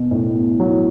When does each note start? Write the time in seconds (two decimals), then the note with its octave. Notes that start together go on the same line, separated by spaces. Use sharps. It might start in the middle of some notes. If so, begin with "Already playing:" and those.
Already playing: B2
0.11 A2
0.35 B2
0.60 F#3
0.69 E3